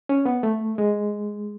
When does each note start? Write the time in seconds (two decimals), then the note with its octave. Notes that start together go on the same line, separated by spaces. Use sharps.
0.09 C#4
0.25 B3
0.43 A3
0.78 G#3